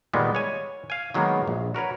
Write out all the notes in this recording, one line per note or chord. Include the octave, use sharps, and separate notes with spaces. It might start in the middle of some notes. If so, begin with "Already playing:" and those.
A#2 D#3 G3 G#3 B3
C#5 G#5
F5 G#5
D#3 F#3 G#3 A#3 B3
A#1
F#4 A#4 B4 C#5